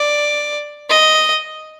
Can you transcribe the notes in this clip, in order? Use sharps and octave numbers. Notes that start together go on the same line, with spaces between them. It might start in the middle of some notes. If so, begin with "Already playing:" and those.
Already playing: D5
D#5